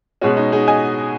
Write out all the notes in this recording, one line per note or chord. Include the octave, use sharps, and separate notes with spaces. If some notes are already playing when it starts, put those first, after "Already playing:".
B2 G#3 C#4 F#4
D#4
D#4 G#4
D#5 G#5